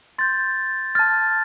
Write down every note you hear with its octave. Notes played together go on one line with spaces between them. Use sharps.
C6 G6 A6
A5 F6 A6